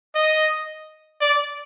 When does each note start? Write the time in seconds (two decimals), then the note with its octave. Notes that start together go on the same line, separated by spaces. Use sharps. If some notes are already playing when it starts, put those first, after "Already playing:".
0.16 D#5
1.21 D5